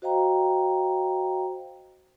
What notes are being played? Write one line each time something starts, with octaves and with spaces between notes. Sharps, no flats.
F#4 C5 D#5 F5 G5 A#5